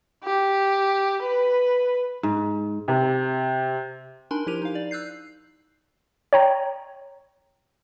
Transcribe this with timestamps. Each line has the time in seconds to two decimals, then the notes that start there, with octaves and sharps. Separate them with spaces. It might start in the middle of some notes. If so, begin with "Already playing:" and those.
0.24 G4
1.23 B4
2.23 G#2
2.88 C3
4.31 D4 D#4 A#4 G#5 B5 C6
4.47 F3 E4 G4 A#4 D#7 F7
4.62 D#4 F5
4.75 D5
4.91 E6 F#6 G6 C7
6.33 C#5 G5 A#5